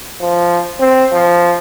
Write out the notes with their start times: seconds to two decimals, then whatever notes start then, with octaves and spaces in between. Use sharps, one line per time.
0.21 F3
0.80 C4
1.12 F3